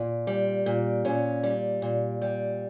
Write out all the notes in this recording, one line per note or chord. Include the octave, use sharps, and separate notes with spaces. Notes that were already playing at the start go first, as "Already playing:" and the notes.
Already playing: A#2
G3
A#2
A#2 C#4
G3
A#2
G3